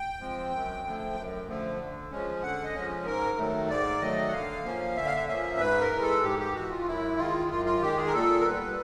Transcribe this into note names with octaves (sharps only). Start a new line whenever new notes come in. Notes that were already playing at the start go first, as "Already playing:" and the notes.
Already playing: G5
F3 G#3 C4
F#2
D3 F3 A3
F#2
D3 F3 A3
D3
F3 G#3 C#4
D3 F#5
D#5
F3 G#3 C#4
G#2 A#4
D#3 F#3 A3
G#2 D5
D#3 F#3 A3 D#5
F#5
D3 F5
F3 A#3 C#4
D3 E5
F5
E5
F3 A#3 C#4 E5
G#2 B4
A#4
E3 G#3
A4
G#2 G4
G4
E3 G#3 F#4
F4
F#2 E4
D#3 G#3 F4
F#2 F4
F4
D#3 G#3 G4
G#4
A#4
A#2 A4
A#4
G3 B3 B4